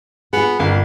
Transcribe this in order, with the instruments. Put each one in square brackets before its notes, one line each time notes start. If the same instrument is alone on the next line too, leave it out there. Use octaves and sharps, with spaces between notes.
[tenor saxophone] B3 [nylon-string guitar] F4 G#4
[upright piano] G1 [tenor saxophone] A#3